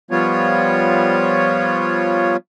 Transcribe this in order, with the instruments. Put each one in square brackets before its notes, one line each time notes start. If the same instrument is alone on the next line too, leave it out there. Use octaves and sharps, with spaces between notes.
[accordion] F3 G3 B3 F4 C#5